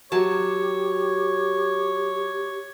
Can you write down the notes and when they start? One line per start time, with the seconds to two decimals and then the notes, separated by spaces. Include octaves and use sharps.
0.12 F#3 G4 C#5 A5